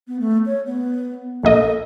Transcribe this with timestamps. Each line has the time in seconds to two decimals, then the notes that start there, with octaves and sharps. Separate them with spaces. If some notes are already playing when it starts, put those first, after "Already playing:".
0.08 B3
0.20 A3
0.46 C#5
0.66 B3
1.43 A#1 A#3 A4 D#5